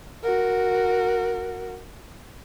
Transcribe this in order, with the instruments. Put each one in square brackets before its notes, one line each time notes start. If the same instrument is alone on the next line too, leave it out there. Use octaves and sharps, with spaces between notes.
[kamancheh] F#4 A#4